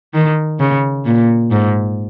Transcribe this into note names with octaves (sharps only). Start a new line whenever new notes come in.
D#3
C#3
A#2
G#2